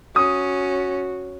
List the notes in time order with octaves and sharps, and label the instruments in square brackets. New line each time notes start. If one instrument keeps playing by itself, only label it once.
[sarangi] C#4 [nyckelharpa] F#4 [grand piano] D#6